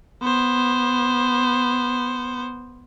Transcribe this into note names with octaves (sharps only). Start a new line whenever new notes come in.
B3 C5